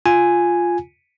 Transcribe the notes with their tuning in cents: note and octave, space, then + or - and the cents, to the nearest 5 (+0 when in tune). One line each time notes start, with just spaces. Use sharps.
F4 +0 G#5 +0